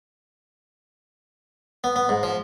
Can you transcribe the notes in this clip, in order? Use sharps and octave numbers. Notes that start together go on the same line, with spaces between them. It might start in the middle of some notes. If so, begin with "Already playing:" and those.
B3
B3
G#2
F3